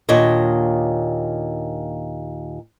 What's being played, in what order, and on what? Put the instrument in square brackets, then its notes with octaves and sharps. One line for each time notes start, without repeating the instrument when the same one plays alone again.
[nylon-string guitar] D#2 A#2 D4 C#5 D#5